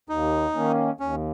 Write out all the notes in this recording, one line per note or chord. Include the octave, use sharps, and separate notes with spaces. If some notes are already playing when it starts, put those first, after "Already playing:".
D#2 D#4
D#3 A#3 C#4
D#2 C#4